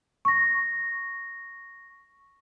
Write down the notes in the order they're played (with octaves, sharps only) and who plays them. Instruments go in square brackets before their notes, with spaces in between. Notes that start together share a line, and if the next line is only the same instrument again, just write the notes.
[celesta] C#6 A#6